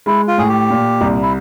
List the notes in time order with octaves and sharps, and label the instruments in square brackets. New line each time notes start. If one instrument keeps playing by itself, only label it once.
[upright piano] G#3 [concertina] E4
[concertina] F4
[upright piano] A2 [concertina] G#4
[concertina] G4
[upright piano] A#2
C2
[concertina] E4